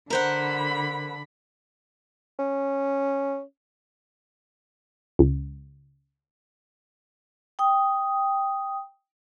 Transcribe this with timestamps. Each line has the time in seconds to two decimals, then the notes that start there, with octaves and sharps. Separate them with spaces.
0.10 D3 A#4 C5 F#5 B5
2.39 C#4
5.19 C#2
7.59 G5 D#6